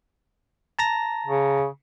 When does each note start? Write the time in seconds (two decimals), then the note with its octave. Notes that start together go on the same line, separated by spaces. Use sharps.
0.79 A5 A#5 A#6
1.27 C#3